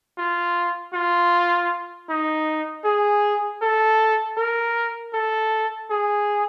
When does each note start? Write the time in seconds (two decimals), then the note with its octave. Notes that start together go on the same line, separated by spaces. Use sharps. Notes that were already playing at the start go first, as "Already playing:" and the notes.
0.18 F4
0.94 F4
2.09 D#4
2.85 G#4
3.62 A4
4.38 A#4
5.14 A4
5.91 G#4